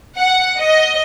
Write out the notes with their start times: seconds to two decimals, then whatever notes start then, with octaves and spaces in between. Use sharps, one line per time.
0.17 F#5
0.59 D#5